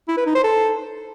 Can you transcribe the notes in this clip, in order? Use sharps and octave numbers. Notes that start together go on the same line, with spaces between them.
E4
B4
D#4
C5
A4